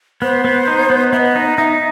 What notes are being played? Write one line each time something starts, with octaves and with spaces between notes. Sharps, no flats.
B3 C5
B3
D#4
B3
B3 D#5 E5
D#4
D#4 E5